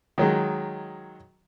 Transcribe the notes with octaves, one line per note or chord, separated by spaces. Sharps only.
D#3 F#3 G#3